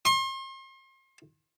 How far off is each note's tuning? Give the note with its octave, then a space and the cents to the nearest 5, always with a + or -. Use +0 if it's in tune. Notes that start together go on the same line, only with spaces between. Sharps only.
C6 +40